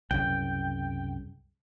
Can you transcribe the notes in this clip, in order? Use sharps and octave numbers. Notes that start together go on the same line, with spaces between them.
C2 F#2 C#3 G5